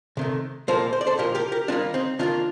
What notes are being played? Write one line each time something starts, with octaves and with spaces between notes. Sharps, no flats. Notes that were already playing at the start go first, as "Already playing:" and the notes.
C3 D#3 A3
A#2 F3 A#3 A4 C5
C5
D5
A4 C5
A#2 F3 A#3 G4 A#4
G4 A#4
G4 A#4
D#3 G3 A#3 D4 F4
C4 D#4
D#3 G3 A#3 D4 F4